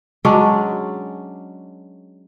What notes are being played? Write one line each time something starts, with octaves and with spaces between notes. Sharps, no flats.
F#3 G#3 C#4 D4